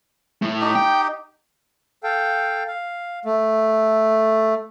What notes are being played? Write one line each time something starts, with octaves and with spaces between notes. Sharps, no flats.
A2 A3
D#4 G4
G5
A4 F5 G5
F5
A3